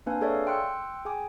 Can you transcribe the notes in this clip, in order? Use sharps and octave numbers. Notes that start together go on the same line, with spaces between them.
A#3 C4 D4 B4 F5 G#5
G#4 A4 C#5 D5 E5 F5
G5 C6 E6 F#6 C#7
G#4 G5 G#5 D6